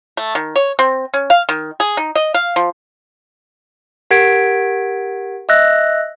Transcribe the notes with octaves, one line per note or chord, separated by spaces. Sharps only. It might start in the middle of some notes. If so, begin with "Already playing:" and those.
A3
D#3
C#5
C4
C#4
F5
D#3
G#4
D#4
D#5
F5
F3
G4 A#4 F#5 G#6 B6 D7
D#5 E5 E6 F#6 A#6